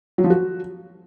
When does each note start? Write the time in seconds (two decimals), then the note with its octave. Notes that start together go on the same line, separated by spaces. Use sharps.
0.18 F#3
0.24 F3
0.30 F#4